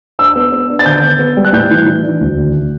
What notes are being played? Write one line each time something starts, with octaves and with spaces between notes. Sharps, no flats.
D4 E6
B3
B3
D4
A6
D3 G6
B3
B3
G3
F#6
A2 G6
E3
E3
D4
D2
D3